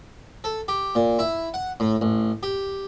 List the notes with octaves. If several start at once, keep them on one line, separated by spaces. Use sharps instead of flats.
A4
G4
A#2
E4
F#5
A2
A1
G4